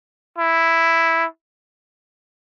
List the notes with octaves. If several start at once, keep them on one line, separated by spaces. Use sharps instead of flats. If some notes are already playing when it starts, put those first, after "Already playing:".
E4